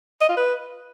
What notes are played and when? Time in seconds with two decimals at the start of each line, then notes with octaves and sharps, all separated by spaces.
0.21 D#5
0.29 F4
0.37 B4